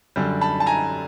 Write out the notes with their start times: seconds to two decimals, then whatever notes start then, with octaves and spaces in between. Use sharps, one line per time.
0.16 F#2 D3 G3
0.41 A5 B5
0.60 A5
0.66 G#5 A#5